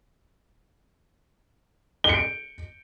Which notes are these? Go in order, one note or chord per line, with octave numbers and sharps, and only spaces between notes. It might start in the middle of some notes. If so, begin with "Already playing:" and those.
C#7 D7 G7